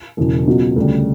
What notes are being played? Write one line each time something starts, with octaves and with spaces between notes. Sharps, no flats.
E1 E2 C#3 F#3
C#2 B2 F#3 F#4
D2 C#3 G3